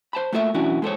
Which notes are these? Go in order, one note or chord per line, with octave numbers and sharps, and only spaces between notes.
C5 A5 B5
A3 A#3 F4 A4 C#5 E5
B1 E3 C#4 D4 E4 F#4
G#3 A4 C5 C#5